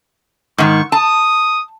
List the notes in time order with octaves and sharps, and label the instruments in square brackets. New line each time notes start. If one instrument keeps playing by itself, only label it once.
[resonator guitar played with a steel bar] G#2 D#3 [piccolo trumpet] C#6
[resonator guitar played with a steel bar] A5 [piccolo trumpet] D#6